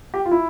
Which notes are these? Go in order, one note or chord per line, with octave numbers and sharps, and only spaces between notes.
G4
F4
E4